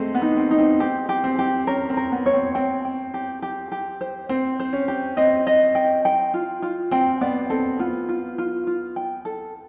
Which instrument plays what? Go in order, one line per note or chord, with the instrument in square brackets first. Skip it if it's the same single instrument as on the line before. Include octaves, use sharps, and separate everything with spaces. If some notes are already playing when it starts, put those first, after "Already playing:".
Already playing: [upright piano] G#3 A3 C4
B3
[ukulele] D#4
[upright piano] C4
[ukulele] D#4
[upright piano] C4
[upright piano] C4 [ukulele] G4
[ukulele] G4
[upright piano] C4
[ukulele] G4
[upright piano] C#4 [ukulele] A#4
[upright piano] C4
[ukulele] A#4
[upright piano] B3
[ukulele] C#5
[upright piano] C4
[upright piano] C4 [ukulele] G5
[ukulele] G5
G4
G4
G4
C5
[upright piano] C4 [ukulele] C5
[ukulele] C5
[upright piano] C#4
[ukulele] G4
[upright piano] C4 [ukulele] D#5
[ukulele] D#5
G5
G5
F4
F4
[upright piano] C4 [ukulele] G5
[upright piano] B3 [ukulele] D5
[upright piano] C4 [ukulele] A4
[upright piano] B3 [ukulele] F4
[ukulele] F4
F4
F4
G5
A4